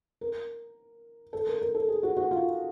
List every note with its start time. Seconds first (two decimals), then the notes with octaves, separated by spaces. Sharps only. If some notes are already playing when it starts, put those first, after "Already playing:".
0.21 A#4
1.33 A4
1.47 A#4
1.62 A#4
1.75 A4
1.88 G#4
2.03 F#4
2.17 F#4
2.31 F4